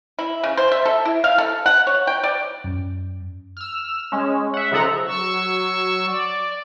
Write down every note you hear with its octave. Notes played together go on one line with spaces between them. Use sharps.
E4
C#3
C5
E5
A4
E4
F5
A4
F#5
C#5
G5
D5
F#2
E6 F6
G#3 C#4
E5 F#5
C#3 F3 D#4 A4 F#5 A#5
F#3 C#6 E6
D5